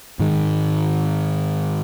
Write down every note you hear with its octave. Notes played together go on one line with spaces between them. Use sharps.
G#2 D#3 G#3